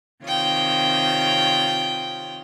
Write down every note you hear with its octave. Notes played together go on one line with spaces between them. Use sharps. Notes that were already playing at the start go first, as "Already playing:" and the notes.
C3 D#3 F4 C#5 G5 D#6